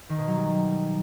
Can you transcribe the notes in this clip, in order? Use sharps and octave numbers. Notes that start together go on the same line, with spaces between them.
D#3
B2
F#3
G3